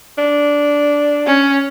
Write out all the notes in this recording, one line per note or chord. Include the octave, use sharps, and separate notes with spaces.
D4
C#4